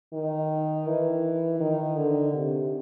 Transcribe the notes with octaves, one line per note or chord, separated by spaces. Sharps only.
D#3
E3
D#3
D3
C3